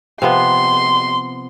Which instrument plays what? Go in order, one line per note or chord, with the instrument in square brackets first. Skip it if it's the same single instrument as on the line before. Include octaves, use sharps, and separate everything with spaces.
[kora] C3 F3 B3 [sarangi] C6